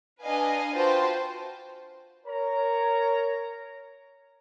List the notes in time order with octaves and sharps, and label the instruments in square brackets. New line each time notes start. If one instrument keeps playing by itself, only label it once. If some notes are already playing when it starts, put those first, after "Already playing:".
[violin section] D4 B4 D#5 F5 G#5
F4 F#4 B4 C5 G5 A5
[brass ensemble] A#4 C#5 A#5